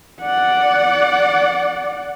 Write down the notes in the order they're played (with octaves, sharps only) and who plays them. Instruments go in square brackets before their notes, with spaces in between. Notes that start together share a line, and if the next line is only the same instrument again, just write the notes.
[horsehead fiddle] D5 F#5